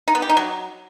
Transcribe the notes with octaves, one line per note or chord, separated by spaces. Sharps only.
D#4
B3
G4
D#4
F#3